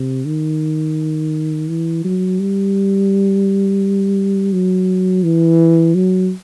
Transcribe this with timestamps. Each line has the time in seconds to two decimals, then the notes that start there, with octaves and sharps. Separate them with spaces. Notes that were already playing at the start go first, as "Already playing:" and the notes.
Already playing: C3
0.26 D#3
1.69 E3
2.04 F#3
2.40 G3
4.53 F#3
5.23 E3
5.95 F#3